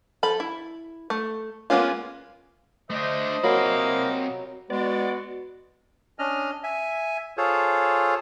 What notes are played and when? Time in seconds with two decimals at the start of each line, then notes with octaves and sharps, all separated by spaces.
0.23 F3 A4 B5
0.40 E4
1.10 A3
1.70 G#3 A#3 B3 C#4 F4
2.90 A3 D4 C5 D#5
3.44 C3 F#3 A#3 B5
4.70 G#3 B3 F#4 D5
6.19 C#4 D4 D#5 F6
6.63 E5 G#5
7.37 F4 G#4 A4 C5 C#5